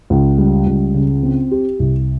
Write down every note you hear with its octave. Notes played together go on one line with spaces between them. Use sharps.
C#2
G3
C#2
C#3
C4
G4
C2